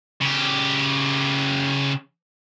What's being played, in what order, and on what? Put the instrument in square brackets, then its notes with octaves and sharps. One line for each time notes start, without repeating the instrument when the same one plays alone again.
[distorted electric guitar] C#3 G4